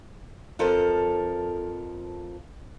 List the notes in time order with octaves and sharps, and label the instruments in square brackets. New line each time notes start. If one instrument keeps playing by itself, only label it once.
[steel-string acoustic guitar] F2 F3 A4 A#4